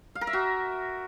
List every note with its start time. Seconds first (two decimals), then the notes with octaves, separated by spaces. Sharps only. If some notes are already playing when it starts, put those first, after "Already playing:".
0.15 F5
0.21 A#4
0.27 E5
0.33 F#4